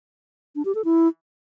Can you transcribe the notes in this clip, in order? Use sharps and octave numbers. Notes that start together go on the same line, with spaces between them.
D4
G4
A4
E4